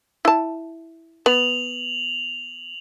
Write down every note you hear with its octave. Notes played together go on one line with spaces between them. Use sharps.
E4 A5
B3 F7 F#7